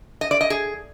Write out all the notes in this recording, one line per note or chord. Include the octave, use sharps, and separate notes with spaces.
D#5
D5
D#5
G#4